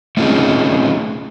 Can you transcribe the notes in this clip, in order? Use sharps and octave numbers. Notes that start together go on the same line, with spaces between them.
A3 C4 C#4 D#4 F4 G#4